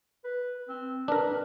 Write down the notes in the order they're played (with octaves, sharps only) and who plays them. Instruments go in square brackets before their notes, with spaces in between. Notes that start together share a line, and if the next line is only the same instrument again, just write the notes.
[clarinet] B4
C4
[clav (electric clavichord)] D4 A#4 [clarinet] B4